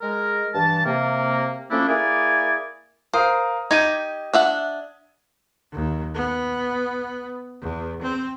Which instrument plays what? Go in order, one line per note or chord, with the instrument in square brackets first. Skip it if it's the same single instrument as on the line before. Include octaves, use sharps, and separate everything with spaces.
[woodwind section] G#3 A#4
G2 E3 A5
C3 A#3
F3 A3 A#3 C#4 D4 E4
A#3 E4 G#4 A#4 D5 G#5
[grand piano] A#4 F5 D#6 [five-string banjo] C5
[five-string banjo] D#4 G4 [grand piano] G#6 D#7
[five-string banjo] D4 E5 F#5
[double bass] D#2
B3
E2
C4